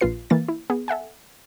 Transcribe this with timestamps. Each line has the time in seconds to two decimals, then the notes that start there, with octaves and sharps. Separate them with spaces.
0.01 A#1 A#2 F4 B4 C7
0.30 E3 A#3 F5 A6
0.48 E4
0.70 B3 G#4
0.88 A4 E5 F#5 G#5